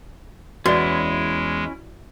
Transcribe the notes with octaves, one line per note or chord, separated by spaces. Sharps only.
E2 G#3 C#4 E4 F#4 D5